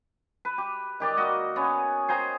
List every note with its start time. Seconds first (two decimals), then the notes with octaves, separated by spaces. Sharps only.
0.45 B4
0.58 G4
1.00 D#3 G4 D5 D#5
1.17 A#3 F#4 D#5
1.56 B3 C#4 G#4
2.08 G#4 C5 G5 A#5